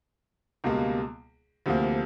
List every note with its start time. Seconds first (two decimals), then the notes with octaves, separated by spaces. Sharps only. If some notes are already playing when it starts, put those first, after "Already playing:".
0.64 C#2 B2 G3 A#3
1.66 D2 C3 F3 A#3